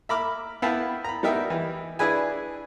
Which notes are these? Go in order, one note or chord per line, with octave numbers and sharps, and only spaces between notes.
E5 A#5 B5 D6 F6
B3 E4 F5 G5 A5 B5
A#5 B5
G3 B3 D#4 A#4 E5 G5
E3
D4 E4 G#4 B4 G#5